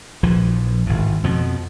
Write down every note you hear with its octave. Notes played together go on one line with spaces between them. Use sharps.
A#1 E3 F3
G#1 A2
F2 B2 F3